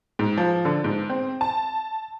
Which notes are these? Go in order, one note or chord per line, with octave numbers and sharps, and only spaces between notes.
G#2
F3
D3
G#2
C4
A5